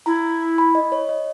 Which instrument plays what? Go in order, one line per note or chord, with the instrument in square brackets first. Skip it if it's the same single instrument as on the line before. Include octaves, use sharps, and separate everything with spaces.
[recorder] E4 [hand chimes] A#5
[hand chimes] B5
D#5
C#5
D#5